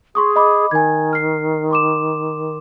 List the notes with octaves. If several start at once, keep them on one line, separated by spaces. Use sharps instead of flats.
G#4 C6 C#6 D#6
D#5 B5 D6
D#3 G#5 G#6
F6 C7
C6 D6 E7